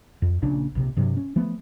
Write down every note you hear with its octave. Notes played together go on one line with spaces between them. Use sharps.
F2
A#1 A#2 C#3 D4
A#1 C3
G2 C3 F#3
C#4
F3 A3 B3